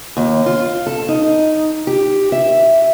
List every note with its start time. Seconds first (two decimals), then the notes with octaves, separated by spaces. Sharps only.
0.17 D#2
0.46 F4
0.87 A4
1.09 D#4
1.87 G4
2.32 E5